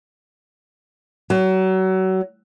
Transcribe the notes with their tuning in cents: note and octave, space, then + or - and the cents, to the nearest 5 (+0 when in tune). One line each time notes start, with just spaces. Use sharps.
F#3 +30